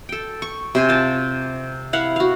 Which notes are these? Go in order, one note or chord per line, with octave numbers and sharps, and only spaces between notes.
A4 G5
C#6
C3 C5 G#5
F4 A5
E4 F5 F#5
F#4 F5